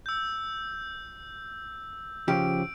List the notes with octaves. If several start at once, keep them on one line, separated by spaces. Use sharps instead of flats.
E6 G6
C#3 F3 G4 D7